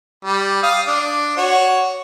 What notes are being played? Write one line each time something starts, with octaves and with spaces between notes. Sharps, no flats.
G3
F5 D#6
D4
F#4 C#5